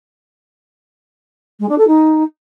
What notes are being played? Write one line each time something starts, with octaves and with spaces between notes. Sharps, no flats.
G#3
D4
A4
D#4